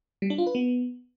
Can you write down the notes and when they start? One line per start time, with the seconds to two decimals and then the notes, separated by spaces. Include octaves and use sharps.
0.22 G3
0.30 D4
0.38 F4
0.47 B4
0.55 B3